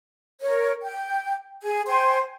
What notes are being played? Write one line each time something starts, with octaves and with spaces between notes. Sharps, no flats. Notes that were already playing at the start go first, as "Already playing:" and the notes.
A#4 C#5
G5
G#4 G#5
C5 G5 G#5 C6